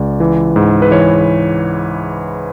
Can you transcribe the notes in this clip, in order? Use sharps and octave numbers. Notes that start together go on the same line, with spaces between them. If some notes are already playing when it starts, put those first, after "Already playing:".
Already playing: C#2 D5
E3
G#2
B4
E3 C#5